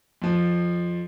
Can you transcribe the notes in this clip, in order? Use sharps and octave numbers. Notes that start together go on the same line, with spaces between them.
F2 F3